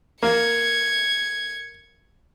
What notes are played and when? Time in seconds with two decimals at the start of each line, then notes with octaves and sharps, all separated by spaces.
0.23 A#3 G#6 C#7